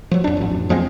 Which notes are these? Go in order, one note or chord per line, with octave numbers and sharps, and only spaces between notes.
F3 F#3
F2 D4
A1 F2
E2 F3 G#3 C4